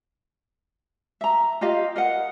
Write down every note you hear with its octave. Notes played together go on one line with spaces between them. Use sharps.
E5 A#5
F4 G4 D#5 F5
A#4 D#5 F5 F#5